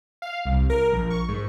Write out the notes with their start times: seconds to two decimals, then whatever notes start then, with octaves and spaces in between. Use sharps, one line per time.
0.22 F5
0.45 C2
0.70 A#4
0.92 A#1
1.10 C#6
1.28 G#2